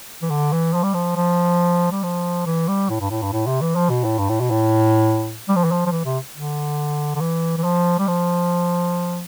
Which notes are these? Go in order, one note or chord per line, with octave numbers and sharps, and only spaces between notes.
E3
D3
E3
F3
G3
F3
F3
G3
F3
E3
G3
A2
G2
A2
G2
A2
C3
E3
F3
B2
A2
G2
A2
B2
A2
G3
F3
E3
F3
F3
E3
C3
D3
D3
E3
E3
F3
G3
F3